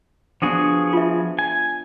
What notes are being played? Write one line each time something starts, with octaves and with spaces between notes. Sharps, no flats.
F3 B3 D4 F#4 G#4
F4 E5
G#5